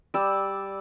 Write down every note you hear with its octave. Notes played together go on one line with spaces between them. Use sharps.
G3 D5 D6 E6